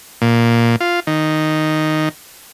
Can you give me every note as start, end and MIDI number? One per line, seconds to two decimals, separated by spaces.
0.22 0.76 46
0.81 1.00 65
1.07 2.09 51